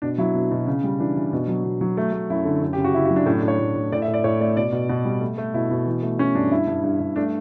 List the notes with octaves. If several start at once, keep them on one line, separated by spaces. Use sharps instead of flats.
B2 D4
F#3 E4
B2
B2
C#3
G3
E3 D4
E3
B2
F#3
B2
F#3
A3
A3
F#2 E4
D3
F#2
G4
C#3
F#4
C#3 E4
F#4
F#3
D4
A2 C#4
D4
A2
C#5
A2
A2
A2 D5
E5
A2
D5
A2 C#5
A3 D5
B2 D5
B2
B2
G3
A3
A3
B2 E4
B2
E3
A3
A3 C#4
G2 D4
G2 E4
G2
G2
G2
A3 D4